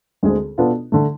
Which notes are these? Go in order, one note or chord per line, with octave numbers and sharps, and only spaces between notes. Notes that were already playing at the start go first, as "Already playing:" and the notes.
D2 D3 G#3 C4 G#4
B2 B3 D4 F4 A4
D3 A3